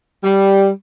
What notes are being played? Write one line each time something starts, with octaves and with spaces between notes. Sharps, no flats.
G3